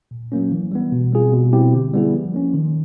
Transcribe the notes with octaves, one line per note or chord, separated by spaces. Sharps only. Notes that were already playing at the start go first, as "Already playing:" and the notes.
A#2
F#3 A#3 C#4
E3
G3 B3
B2
G3 C4 F4 G#4
B2
G3 C4 E4 G4
D3
G3 B3 E4 G#4
F3
A#3 C#4
D#3